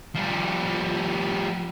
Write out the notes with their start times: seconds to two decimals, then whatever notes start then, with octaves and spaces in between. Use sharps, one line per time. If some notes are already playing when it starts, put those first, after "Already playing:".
0.15 F3 G3